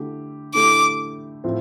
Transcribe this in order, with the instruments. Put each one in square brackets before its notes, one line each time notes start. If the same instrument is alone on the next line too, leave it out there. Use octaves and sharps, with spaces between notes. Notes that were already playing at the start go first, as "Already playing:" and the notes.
Already playing: [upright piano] D3 A3 E4 G4
[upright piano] D3 A3 E4 G4 [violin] D6
[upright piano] A2 F3 C4 F4